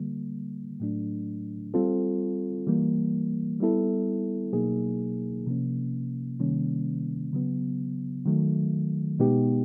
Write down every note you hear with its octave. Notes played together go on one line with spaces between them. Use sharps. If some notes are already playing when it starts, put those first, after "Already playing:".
Already playing: D3 G3 A#3
A2 F#3 A3 D4
G3 C4 F4 A4
E3 G3 A#3
G3 B3 E4 A4
B2 F#3 A#3 D#4 G#4
C3 F3 A#3 C#4
C3 D#3 G3 A#3 C#4
C#3 F#3 B3
D#3 F#3 A3
B2 G#3 B3 D#4 G4